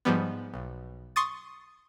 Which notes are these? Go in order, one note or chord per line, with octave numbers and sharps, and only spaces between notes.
G#2 F3 G3 B3
B1
C6 C#6 D#6 A6